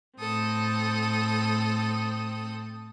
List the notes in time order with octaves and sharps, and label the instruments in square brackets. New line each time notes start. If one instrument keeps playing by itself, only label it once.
[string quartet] A2 C4 A4 D#6